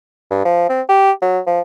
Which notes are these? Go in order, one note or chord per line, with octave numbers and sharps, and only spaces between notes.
G2
F3
C4
G4
F#3
F3